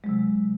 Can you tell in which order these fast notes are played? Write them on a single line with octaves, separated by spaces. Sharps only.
G#3 F#3 C3